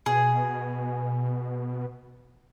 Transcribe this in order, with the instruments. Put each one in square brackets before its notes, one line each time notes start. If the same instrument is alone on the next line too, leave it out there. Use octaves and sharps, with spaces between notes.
[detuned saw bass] B2 [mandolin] G#4